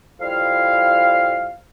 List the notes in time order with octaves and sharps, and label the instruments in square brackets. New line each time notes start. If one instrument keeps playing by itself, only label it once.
[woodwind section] F2 G3 E4 F5